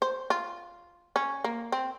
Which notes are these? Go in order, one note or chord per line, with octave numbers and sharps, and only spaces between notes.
C5
F4
C#4
A#3
C4